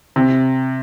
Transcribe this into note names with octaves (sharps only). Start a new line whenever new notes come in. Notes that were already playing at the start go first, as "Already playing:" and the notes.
C3